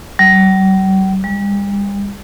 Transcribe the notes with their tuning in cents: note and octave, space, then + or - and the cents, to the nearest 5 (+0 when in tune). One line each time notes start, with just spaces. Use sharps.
G3 -45
G3 +40